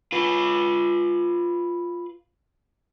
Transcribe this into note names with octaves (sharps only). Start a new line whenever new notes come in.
F4 B4